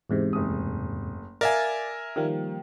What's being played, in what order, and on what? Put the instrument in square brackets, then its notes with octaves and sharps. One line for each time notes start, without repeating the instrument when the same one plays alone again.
[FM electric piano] E2 G#2 C3
[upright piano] F#1 A3 D#6
[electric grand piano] A#4 E5 G#5 [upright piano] D5 F5 [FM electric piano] A6
[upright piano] D#3 [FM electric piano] F3 G3 A#3